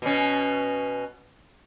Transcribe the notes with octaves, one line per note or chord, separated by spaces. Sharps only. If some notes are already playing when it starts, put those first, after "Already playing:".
B2 C#4